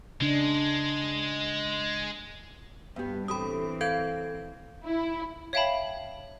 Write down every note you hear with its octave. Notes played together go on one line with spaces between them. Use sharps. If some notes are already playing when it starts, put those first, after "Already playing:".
C#3 G#3 D4
G2 G3 B3
A2 E3 C4 G4 B5 D#6
A4 F5 G6 G#6
E4
C#5 E5 F5 G5 A5 B5